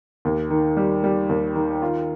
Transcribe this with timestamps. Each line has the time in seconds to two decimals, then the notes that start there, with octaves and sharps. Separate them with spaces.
0.25 D#2
0.50 D#3
0.77 G3
1.04 G3
1.29 D#2
1.55 D#3
1.82 F4